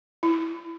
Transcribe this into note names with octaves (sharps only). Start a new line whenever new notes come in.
E4